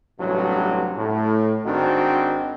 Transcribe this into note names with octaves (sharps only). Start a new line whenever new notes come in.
A1 G2 C3 F#3
A2
G#1 D#3 C4 D4 F#4